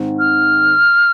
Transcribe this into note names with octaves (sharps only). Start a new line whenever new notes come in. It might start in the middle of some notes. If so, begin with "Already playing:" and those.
Already playing: G#2 D#3 C4
F6